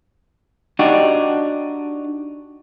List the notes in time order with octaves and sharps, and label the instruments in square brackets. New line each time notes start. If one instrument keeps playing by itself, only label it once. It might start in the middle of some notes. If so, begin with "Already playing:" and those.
[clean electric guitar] D4 D#4 F#4 G4